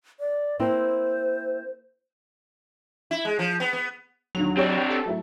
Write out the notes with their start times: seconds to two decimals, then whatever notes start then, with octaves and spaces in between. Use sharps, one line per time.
0.20 D5
0.59 A#3 C4 E4 C5
3.11 E4
3.25 G#3
3.39 F3
3.60 B3
3.73 B3
4.35 D#2 D3 F#3 F7
4.57 C4 D4 G4 C#5
4.91 A4
5.06 F#3 A3 E4